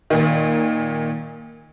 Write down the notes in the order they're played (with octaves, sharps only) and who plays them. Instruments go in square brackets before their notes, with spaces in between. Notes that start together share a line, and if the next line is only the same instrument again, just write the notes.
[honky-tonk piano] A#2 D#3